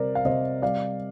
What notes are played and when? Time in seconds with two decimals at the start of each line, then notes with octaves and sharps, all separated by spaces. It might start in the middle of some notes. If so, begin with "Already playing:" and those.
Already playing: C3 G3 A#4 C5 D5
0.15 F5
0.25 C3 C5 D#5
0.62 G3 D5 F5